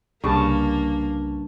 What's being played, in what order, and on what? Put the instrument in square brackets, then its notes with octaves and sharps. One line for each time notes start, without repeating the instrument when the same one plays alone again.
[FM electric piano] C2 [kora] G2 C#3 [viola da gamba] A#3 [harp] A5 C#6